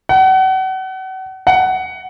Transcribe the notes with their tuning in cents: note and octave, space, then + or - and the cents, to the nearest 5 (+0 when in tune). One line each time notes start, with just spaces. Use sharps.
F#5 +35
F#5 +15